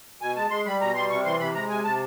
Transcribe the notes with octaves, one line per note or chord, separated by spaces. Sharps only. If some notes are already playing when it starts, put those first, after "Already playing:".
B2 G#5
G#3 A5
G#3 C6
G3 B5
B2 A#5
G3 C6
C3 C#6
E3 C6
C3 B5
G#3 A#5
C3 G#5
C3 A5